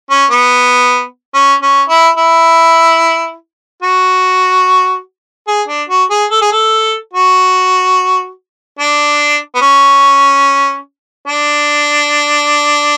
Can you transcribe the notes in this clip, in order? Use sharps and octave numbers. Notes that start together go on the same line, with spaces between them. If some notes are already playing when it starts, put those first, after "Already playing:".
C#4
B3
C#4
C#4
E4
E4
F#4
G#4
D4
F#4
G#4
A4
G#4
A4
F#4
D4
B3
C#4
D4